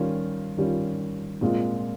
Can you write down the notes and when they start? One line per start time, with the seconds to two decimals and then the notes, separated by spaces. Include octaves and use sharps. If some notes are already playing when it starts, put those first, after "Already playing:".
Already playing: D#3 G3 C#4 F4
0.57 D#3 G3 C#4 F4
1.41 A#2 G#3 C4 F4